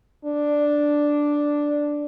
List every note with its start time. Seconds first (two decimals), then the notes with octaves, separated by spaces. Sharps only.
0.25 D4